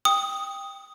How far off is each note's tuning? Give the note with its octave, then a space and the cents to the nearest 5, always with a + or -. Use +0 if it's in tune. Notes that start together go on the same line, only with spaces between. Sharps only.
G5 +15 D#6 +5